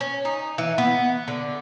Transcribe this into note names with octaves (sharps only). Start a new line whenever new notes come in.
C#4
D#4
E3
B3
D3